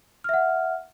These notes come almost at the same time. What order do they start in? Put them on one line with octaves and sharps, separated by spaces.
F6 E5 F#5